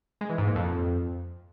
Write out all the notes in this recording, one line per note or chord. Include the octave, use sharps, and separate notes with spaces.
G#3
E3
G#2
A#2
F2